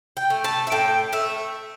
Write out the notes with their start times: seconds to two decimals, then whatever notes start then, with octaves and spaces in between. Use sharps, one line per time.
0.17 G5
0.30 A3
0.44 A5
0.67 E5
0.72 A2 G5
1.12 A3 E5